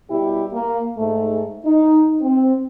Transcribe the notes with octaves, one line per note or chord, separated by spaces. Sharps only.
B2 G3 E4 G4
A#3
G#2 A3
D#4
C4